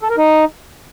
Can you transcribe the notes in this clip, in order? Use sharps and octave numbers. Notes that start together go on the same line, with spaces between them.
A4
A#4
D#4